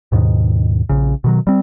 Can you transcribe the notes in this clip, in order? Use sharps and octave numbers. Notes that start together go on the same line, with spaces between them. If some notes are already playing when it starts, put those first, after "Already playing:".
D#2 G#2 B2 D#3
A#1 C#3
B2 D#3 F#3
G3 C4